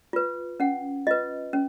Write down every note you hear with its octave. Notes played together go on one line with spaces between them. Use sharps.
F4 B4
C#4 F#5
F4 B4 D#5
C#4